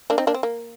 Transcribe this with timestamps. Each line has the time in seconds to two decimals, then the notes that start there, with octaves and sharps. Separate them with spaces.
0.10 A#3 D4
0.18 C4 D#4
0.27 A#3 D4
0.34 C4
0.43 A#3